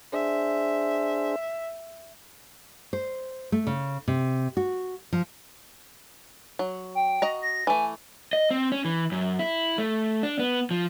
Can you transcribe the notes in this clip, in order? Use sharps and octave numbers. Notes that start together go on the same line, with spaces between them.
D4 G#4 C5 E5
C5
A3
C#3
C3
F#4
F3
F#3
G5
F#4 D#5 A#5
A#6
E3 A3 G#5
D#5
C4
C#4
E3
F#2
E4
A3
D4
B3
F3